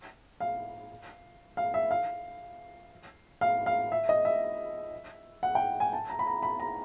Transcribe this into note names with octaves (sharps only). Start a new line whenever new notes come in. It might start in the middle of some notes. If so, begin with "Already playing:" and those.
F5
F5
E5
F5
F5
F5
E5
D#5
E5
F#5
G5
G#5
A5
A#5
B5
A#5
B5
A#5